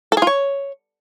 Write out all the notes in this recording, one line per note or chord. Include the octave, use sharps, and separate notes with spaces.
A4
G#4
F4
C#5